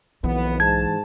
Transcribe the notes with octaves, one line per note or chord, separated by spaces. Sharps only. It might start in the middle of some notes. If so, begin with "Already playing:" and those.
F#1 B1 F2 E3 B3
G#2 A5 G#6